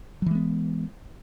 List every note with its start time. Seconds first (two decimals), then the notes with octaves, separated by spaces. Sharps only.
0.22 F#3
0.26 E3
0.31 G#3
0.35 B3